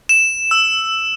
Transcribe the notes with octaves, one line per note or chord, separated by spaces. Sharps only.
E7
E6